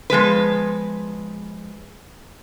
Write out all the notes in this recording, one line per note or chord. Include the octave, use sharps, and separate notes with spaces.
F3 G#3 B3 B4